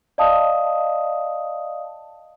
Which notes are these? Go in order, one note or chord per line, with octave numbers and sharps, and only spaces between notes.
D5 D#5 F5 A5 D#6